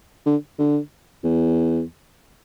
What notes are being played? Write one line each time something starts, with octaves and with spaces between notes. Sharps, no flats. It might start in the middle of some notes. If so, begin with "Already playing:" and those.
D3
D3
E2